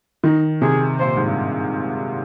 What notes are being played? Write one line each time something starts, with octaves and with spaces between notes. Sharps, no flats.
D#3 D#4
C3 G#4
A#2 C5
G#2
G2